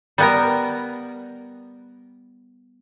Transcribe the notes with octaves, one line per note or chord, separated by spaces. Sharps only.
G3 B3 A#4